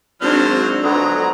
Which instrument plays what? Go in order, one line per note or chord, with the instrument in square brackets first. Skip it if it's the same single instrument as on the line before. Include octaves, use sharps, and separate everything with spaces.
[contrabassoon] G#1 [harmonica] F#3 C5 F6 [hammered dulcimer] C4 [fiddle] D4
[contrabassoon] D3 [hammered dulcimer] F3 G#3 B3 [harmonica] F#3 [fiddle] A#5